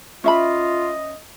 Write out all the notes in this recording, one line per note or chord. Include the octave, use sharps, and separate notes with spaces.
C#4 F4 D#5 E5 B5